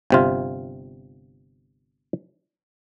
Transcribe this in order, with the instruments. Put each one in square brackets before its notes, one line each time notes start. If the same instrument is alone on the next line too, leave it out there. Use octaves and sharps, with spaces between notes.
[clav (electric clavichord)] G1 C3 F4